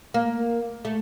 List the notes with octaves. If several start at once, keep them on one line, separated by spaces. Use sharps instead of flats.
A#3
A3